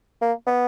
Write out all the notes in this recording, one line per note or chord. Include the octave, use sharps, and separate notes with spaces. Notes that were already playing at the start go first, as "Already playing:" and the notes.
A#3
B3